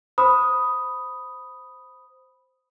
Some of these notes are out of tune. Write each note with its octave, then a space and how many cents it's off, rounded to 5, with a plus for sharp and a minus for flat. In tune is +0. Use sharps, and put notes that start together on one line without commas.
C5 +0 B5 +0 D#6 +0